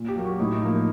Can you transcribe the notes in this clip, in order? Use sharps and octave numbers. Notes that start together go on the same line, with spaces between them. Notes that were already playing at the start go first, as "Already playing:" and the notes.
Already playing: A#2
G4
F#3 A#3
F#4
A2 D#4
F3 A#3